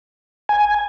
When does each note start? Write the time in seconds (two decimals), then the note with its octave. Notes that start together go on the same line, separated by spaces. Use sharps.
0.49 G#5